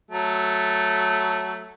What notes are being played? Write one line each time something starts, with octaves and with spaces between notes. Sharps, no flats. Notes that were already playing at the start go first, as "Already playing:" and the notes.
F#3 A3